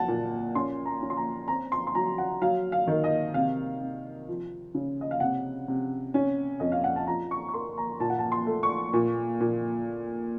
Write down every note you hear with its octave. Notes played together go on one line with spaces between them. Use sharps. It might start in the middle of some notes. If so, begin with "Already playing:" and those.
Already playing: F#3 F#5 A5
A#2
C#4 C6
A#5
C#4
C6
A#5
C4 A#5
C6
C6
F#3 A#5
F#5
F#3 F5
F5
D#3
D#5
C3 F5
C3
F3
C#3
D#5
F5
C3 F#5
C3
C#4
F2 D#5
F5
F#5
A5
F3 A#5
C#6
C#6
A#3 C6
A#5
A#2 A5
F#5
A5
C6
A3
C#6
A#2
A#2